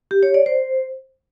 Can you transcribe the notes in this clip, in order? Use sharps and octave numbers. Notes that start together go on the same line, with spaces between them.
G4
C#5
D5
C5